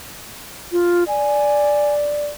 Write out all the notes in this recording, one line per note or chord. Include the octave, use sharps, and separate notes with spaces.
F4
D5 G#5